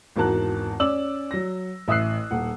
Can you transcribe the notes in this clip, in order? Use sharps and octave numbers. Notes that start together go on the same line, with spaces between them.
G#1 E2 F#4 A#4 A5 F#6
C#4 D5 E6 F#7
F#3 A#6
A1 E5 D#6 E6 F#6 C7
D#1 F#5